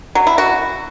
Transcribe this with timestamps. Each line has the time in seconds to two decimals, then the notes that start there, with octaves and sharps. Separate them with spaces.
0.15 F#3
0.27 E4
0.38 F#4